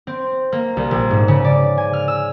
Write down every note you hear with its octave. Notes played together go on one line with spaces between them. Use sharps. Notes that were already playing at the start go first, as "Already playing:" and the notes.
C4
A#3
C2
A#1
G#2
C#3
D5
G#5
F6
E6